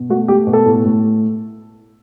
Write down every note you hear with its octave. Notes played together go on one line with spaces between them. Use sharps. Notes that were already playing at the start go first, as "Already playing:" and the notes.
Already playing: B2
A3 F#4
A3 G4
B2
A4
A2
A2